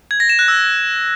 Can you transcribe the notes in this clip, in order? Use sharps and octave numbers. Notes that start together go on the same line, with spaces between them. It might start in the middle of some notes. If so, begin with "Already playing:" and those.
G#6
A#6
E7
F#6
E6